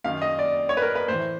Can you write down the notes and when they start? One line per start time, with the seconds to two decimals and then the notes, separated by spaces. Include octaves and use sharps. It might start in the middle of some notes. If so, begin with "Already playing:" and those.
0.04 F#2 D#3 F5
0.22 D#5
0.39 D5
0.69 C#5
0.77 B4
0.82 A#4
0.95 B4
1.08 A2 E3 C5